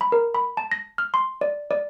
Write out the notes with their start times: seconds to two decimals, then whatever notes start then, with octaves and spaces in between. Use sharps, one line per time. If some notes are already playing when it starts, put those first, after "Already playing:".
0.01 B5
0.12 A#4
0.34 B5
0.57 A5
0.72 A#6
0.98 F6
1.14 C6
1.41 D5
1.71 D5